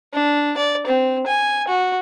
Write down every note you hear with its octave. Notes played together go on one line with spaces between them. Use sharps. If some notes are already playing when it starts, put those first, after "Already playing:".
D4
D5
C4
G#5
F#4